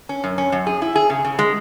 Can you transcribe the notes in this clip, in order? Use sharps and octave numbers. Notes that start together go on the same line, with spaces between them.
C#4
F#2
C#4
F#2
G#4
E4
G#4
C#3
C#3
G#3